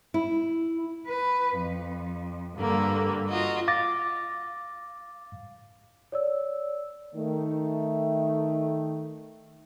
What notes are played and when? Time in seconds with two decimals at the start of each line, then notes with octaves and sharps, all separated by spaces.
0.14 E4
1.07 B4
1.58 F2
2.56 G2 D3 A#3
3.29 F4 F#4 D#5
3.68 F5 D6 A6 A#6
6.12 C#5 D5 E6
7.15 D#3 A3